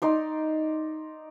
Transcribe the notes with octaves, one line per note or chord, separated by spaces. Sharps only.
D#4 D5 C6